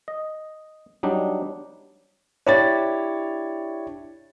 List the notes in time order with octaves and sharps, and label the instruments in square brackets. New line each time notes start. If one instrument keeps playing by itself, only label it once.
[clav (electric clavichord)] D#5
F#3 G3 D4 D#4
[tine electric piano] D4 E4 G4 [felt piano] C#5 A6